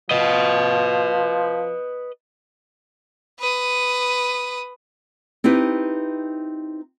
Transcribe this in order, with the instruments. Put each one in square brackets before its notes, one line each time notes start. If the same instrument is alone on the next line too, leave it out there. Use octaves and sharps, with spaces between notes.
[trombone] F3 [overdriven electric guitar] B4 D#5
[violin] B4 D#6
[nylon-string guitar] C4 D#4 E4 G4 B4